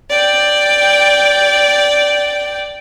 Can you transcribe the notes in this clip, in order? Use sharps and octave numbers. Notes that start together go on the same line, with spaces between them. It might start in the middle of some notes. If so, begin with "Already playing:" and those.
D5 G5